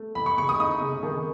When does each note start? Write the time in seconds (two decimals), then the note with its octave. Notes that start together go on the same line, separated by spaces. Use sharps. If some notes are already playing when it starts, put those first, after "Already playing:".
Already playing: A3
0.15 E3 B5
0.26 C#6
0.37 C#3 C#6
0.49 D#6
0.60 D#4 D#6
0.81 C#3
1.03 D#3